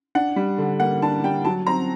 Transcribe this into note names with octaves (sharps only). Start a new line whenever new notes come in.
D4 F#5
G3
D3
A#3 F#5
D4 A5
G3 G5
F#3 A5
C4 A#5